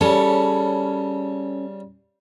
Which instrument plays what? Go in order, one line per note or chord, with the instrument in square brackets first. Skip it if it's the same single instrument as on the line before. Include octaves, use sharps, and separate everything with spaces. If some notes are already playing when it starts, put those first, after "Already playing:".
[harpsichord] C#3 G3 [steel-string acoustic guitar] C#4 A4